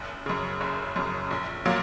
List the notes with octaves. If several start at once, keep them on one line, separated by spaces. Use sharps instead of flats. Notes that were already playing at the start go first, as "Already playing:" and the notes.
Already playing: F#1
F#2 C#3
F#1
F#2 C#3
A#1
A#2 F#3 A#3